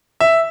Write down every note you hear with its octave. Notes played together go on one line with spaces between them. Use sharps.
E5